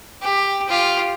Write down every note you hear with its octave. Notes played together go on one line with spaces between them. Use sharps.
G4
F4 G4